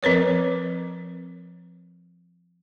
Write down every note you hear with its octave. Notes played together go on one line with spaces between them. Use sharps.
F3 C4 A#4 B4 C#5